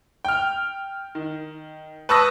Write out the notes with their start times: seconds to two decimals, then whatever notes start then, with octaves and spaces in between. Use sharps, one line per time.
0.25 G5 F6
1.15 D#3
2.09 B4 A5 C#6 D#6 E6 A#6